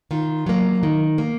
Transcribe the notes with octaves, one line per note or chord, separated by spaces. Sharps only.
D#3 F4
F#3 A#3
D#3
A#3